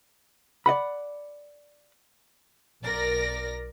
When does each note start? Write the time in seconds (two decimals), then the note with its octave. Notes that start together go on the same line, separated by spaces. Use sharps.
0.66 D5 D#5 F#5 B5
2.81 B1 A#4 D5 A#6